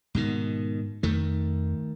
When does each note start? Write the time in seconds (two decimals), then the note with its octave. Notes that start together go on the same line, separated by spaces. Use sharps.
0.15 G#2 B2 D#3
1.03 F2 D#3 A3